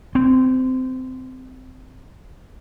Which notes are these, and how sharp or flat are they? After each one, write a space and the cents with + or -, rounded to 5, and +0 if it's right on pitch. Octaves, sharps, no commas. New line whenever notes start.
C4 -20